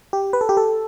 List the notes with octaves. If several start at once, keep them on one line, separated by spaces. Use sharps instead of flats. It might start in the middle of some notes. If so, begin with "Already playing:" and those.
G4
B4
A4
G4
A4